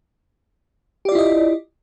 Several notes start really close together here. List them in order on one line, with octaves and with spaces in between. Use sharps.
G4 D5 F4 E4 D#5